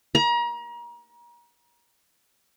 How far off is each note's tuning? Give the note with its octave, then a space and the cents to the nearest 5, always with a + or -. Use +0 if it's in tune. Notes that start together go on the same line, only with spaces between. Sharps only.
A#5 +35